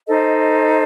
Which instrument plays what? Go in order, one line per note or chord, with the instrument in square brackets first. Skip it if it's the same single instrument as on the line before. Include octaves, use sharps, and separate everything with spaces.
[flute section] D#4 A4 C5 D#5